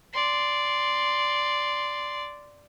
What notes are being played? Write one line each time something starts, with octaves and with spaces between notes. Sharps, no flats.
D5 C6